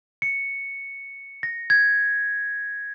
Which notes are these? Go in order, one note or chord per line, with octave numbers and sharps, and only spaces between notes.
C#7
A#6
G#6